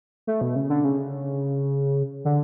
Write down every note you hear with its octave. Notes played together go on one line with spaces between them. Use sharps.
A3
B2
C#3
D3
C#3
D3